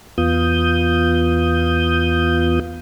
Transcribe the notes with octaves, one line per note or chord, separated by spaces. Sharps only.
E2 B3 F4 D#6 G6